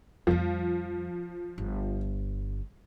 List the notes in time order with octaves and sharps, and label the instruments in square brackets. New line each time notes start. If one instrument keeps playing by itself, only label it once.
[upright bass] F2 G3 [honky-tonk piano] F3
[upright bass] G1